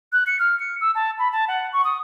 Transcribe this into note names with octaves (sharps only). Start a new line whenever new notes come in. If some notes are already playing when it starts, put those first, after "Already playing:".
F#6
C#7
F6
C#7
E6
A5
B5
A5
F#5
C#6
D#6